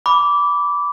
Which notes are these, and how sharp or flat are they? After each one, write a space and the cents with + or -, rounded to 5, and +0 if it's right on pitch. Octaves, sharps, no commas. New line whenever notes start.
B5 +0 D6 -15